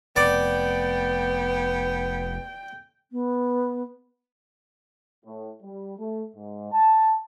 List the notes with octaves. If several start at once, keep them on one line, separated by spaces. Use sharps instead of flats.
F1 B3 D5 G5
B3
A2
G3
A3
G#2
A5